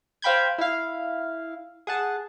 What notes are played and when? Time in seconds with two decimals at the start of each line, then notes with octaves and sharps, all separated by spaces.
0.22 C5 F5 G5 B5 G6 G#6
0.58 E4 F5
1.87 G#4 F#5 A5